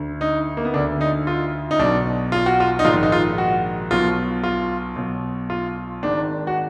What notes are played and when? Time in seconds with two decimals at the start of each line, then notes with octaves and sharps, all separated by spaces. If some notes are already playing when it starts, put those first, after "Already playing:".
Already playing: D2 D3
0.21 D#4
0.57 A#3
0.65 B3
0.74 D2 D3 D4
1.01 D#4
1.27 F4
1.71 D#4
1.79 B1 B2 D4
2.32 F4
2.46 F#4
2.60 F4
2.79 D#4
2.85 A#1 G#2 D#3 F4
3.03 D#4
3.12 F4
3.38 F#4
3.91 B1 B2 F4
4.44 F4
4.96 B1 B2
5.50 F4
6.03 G#1 G#2 D#3 D4
6.47 F#4